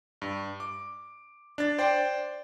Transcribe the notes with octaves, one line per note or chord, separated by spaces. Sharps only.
G2
D6
D4 A6
C5 D5 G5